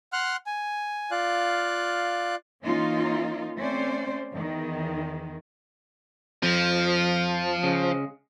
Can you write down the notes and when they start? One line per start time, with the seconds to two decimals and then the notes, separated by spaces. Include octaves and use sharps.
0.13 F#5 C6 F6 F#6
0.46 G#5
1.11 F4 D5 F5 F#6
2.64 E3 A#3 C#4 D#4 F4
3.58 A3 C4 C#4 C5 D5
4.32 E2 D#3
6.43 F2 F3
7.63 C#3 G#3